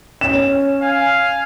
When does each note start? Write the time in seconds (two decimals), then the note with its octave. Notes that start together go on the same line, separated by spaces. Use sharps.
0.21 C#4 E7
0.82 F5 G#5